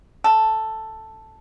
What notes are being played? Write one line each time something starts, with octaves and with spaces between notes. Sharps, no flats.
A4